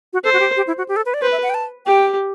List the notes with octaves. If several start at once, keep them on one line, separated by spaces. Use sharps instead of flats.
F#4
A4 C5
F#4
G4
G4
E4
F#4
G4
A4
B4
D5
B4 C5
E5
F#5
G5
A5
G4 G5